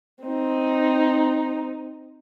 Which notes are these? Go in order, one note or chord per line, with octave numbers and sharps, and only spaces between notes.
C4 D#4